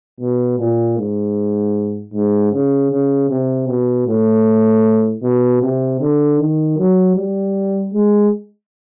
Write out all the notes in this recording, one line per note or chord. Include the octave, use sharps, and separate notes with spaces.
B2
A#2
G#2
G#2
C#3
C#3
C3
B2
A2
B2
C3
D3
D#3
F#3
G3
G#3